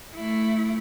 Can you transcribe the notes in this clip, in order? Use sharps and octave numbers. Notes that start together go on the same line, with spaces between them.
A3 E4